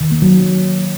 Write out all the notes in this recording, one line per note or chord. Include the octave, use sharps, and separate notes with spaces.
D#3
A#3
F#3